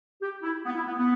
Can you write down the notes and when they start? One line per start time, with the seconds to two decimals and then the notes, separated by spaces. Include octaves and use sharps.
0.22 G4
0.43 E4
0.65 B3
0.75 E4
0.86 B3
0.97 B3